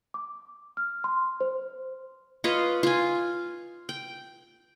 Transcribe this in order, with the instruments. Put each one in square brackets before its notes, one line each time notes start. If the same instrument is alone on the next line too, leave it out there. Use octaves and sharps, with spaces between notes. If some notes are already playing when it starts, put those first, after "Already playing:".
[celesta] D6
F6
C6
C5
[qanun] F4 B4 C#5 D#5
F4 G#5
G5